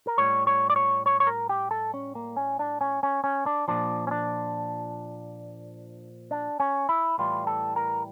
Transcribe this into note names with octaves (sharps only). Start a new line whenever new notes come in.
A#4
A2 G3 C#5
C#5
D5
C#5
C#5
C#5
A#4
G4
A4
C#4
A#3
C#4
D4
C#4
C#4
C#4
D4
A#2 F3 D4
C#4
D4
D4
C#4
E4
A2 E3 G3 F4
A4
A#4